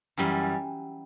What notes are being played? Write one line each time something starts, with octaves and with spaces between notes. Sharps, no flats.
F#2 E3 G3